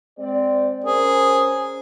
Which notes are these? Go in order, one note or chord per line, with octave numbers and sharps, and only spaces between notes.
G#3 C4 D5
C#4 G#4 A#4 C5